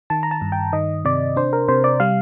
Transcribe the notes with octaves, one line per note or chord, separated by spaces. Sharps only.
D#3 A5
A#5
A5
G2
G5
D#3 D#5
C3 D5
D4 C5
A#4
C3 C5
D5
G3 F5